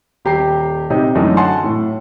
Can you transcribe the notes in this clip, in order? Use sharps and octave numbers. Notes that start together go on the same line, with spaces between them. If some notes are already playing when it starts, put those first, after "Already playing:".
D#1 G4 A#5 C7
C3 D#4 G4
F#2 D3 E3 G#3 A3 D#4
F#5 G#5 A5 C6
A2